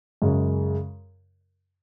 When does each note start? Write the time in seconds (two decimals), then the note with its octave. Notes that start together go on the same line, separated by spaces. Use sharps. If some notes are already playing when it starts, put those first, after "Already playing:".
0.22 F#2 C#3 G#3